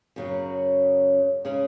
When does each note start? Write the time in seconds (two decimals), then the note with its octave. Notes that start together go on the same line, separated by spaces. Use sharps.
0.16 F#2 C#3 F#3
1.45 C#3 G#3 C#4 G#4